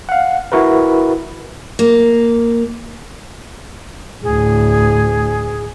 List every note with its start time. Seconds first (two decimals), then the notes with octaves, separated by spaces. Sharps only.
0.09 F5 F#5
0.52 E4 F#4 A#4 B4
1.79 A#3
4.23 D2 A2 G#4